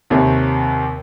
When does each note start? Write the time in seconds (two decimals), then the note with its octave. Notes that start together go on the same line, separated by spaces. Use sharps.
0.10 D#2 C3 C#5